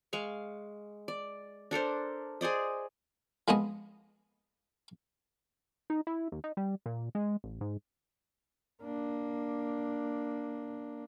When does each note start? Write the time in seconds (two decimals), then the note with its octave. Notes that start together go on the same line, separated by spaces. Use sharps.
0.13 G#3 F5 C#6
1.08 D5
1.71 D4 A4 A#4 C5
2.41 G#4 C5 D5 D#5
3.48 F3 G#3 B3 C4 D#5 D#6
5.90 D#4
6.07 E4
6.32 D#2
6.44 D#4
6.57 G3
6.86 A#2
7.15 G#3
7.44 A1
7.61 G#2
8.82 A#3 D4